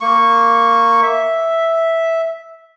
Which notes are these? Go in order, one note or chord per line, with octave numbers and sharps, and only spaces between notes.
A#3 C#6
E5